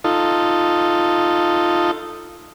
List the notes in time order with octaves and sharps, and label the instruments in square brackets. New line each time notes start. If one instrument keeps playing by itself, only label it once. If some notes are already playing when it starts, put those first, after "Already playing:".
[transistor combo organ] D#4 F4 A4